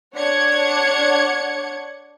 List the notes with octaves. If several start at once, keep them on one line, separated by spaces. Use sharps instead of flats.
D4 C#5 F#5 G#6 C#7